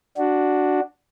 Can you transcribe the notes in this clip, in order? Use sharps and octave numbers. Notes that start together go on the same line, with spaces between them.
D4 F#4